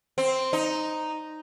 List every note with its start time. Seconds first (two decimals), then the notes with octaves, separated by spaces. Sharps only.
0.18 C4
0.53 D#4